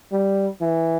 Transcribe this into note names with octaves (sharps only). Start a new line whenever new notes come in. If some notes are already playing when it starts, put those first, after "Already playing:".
G3
E3